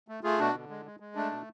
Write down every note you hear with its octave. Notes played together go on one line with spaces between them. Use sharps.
A3
A3 F4 G#4
B2 D4 F#4
D3
G#3
G#3
G#3
A3 D4
B2